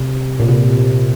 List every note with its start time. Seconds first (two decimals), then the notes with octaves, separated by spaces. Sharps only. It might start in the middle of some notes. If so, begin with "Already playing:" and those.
Already playing: C3
0.40 A#2
0.48 C3